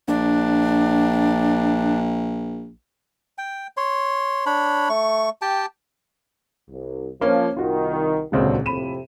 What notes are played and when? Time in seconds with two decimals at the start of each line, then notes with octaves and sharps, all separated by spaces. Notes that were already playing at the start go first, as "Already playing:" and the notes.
0.08 A#1 D4
3.38 G5
3.77 C#5 C6
4.46 D4 C#5 B5
4.89 A3 C#6
5.42 G4 G5 A5
6.70 C2
7.21 F3 A#3 C#4
7.57 C2 D#3 F4 F#4
8.32 D#1 G#1 C#2 D3 F#3 C4
8.66 F2 A2 C3 B5 D#7 E7